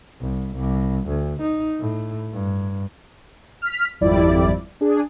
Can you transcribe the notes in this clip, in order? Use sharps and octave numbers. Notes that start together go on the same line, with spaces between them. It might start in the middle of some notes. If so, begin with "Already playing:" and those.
C2
C2
D2
D#4
A2
G2
F6 B6
G#1 F2 G3 E4 D5
D4 G#4